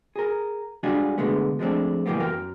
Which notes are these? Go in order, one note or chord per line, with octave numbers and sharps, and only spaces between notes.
G#4 A#4
G3 G#3 D4 F4 F#4 G#4
B2 D3 G#3 A3 B3
F3 G#3 A3 C4 D4
A2 E3 G3 A#3 B3
F#2 A#4 G5